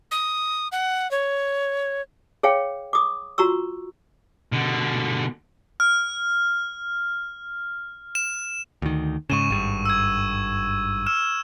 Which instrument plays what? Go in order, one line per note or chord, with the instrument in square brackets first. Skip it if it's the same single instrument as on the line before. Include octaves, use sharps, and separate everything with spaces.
[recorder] D#6
F#5
C#5
[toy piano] G#4 C#5 F5 G5
D6 D#6
F4 F#4 A#5 C#6 E6
[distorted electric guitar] B2 D3
[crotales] F6
E7
[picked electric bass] D2 D#3
[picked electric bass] G#2 C#3 [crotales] C#6 D#7 E7
[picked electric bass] G#1 G2
[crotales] E6 G#6
E6 F6 E7